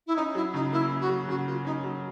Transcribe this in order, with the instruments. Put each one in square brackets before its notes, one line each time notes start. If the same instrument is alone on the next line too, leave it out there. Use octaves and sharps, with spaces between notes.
[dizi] E4
[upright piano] C#4 [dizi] D#4
[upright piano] F#3 [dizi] E4
[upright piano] C#3 [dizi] D#4
[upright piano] A#3 [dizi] E4
[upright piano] C#4
[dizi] F#4
[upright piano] F#3
[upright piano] C#3 [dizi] F#4
[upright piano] A#3 [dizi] F4
[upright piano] C#4 [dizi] D#4
[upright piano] F#3